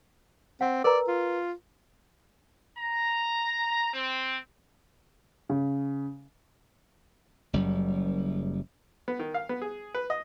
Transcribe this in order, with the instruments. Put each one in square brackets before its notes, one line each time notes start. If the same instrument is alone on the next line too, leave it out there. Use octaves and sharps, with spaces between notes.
[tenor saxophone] C4 [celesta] F#5
[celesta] A#4 B4 A#5 [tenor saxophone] D5
[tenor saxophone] F4
[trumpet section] A#5
C4
[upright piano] C#3
[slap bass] F#1 F#2 G3
[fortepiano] B3
D#3
F5
B3
G#4
B4
D#5